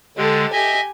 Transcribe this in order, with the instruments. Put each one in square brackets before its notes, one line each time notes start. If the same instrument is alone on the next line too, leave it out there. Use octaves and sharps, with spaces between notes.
[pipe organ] D3 G#3 [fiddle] G4 A4
[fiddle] G4 G#5 [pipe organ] D#5 E5